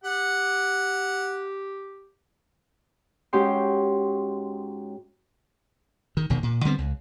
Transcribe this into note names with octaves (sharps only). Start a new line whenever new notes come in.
G4 F#5
G#2 C#4 F#4 G4 C6 G6
D#3
E1 B2 D#3
A#2
D3 G3 B3 C4
C#2